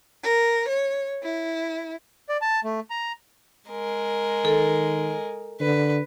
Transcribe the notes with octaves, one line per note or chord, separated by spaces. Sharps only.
A#4
C#5
E4
D5
A5
A3
A#5
G#3 A#4
D#3 A4
D3 B4